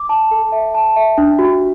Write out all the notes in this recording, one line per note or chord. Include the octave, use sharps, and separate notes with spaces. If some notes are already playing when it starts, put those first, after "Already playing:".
Already playing: D6
A5
A4
E5
A5
E5
D4
F#4